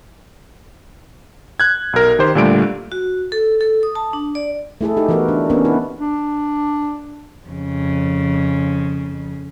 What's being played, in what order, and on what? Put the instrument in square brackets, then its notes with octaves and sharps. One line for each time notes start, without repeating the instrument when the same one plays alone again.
[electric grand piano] F#6 G#6
B1 A#4
D#3 G4 C5
A#2 D3 G3 A3 D7
[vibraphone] F#4
A4
A4
D#6
A5
D4
D5
[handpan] A3 E4 G#4 A4
D#4 G4 G#4
E3 B3 F#4 A#4 B4
D4
A#3 B3 C#4 D4 A#4
D#4 E4 B4
[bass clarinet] D4
[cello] F2 C#3